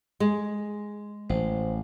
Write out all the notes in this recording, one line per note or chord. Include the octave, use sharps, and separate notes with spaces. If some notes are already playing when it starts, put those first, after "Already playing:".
G#3
A1 C5